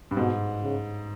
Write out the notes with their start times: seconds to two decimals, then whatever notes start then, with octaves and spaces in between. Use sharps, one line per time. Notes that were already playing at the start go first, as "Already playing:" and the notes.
0.11 G2
0.17 G#2 B2
0.62 C#3